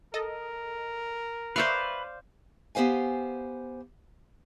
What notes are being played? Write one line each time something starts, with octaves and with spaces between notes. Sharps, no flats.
A4 A#4 D#5
B4 C5 D5 E5 F5 C#6
B3 G4 C5 F5 G#5